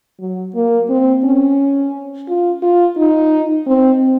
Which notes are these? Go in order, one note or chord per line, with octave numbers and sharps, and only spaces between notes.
F#3
A#3
C4
C#4
F4
F4
D#4
C4